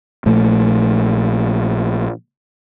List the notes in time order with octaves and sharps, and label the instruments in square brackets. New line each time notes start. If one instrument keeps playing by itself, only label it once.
[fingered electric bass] A#1 A#2 F3 A3